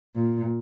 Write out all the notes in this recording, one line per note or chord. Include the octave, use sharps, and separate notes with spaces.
A#2